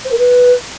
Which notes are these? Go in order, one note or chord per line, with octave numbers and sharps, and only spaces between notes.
C5
A#4
B4